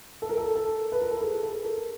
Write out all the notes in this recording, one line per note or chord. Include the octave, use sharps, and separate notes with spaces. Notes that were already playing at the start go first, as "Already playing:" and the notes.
A4
A#4
A4
A4
B4
A#4
A4
G#4
A4
A#4